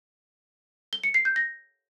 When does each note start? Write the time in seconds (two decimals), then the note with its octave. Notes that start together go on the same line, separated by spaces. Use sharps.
0.93 G7
1.04 C#7
1.14 C7
1.25 G6
1.36 A#6